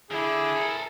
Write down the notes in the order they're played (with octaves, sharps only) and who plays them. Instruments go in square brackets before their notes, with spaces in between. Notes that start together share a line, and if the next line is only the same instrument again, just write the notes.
[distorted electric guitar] D3 [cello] E4 [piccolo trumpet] G#4
[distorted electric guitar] A4 A#4